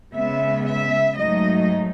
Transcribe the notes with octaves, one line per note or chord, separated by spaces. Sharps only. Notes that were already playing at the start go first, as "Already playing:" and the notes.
C#3 G#3 B3 E5
E5
G#2 F#3 A3 D#4 D#5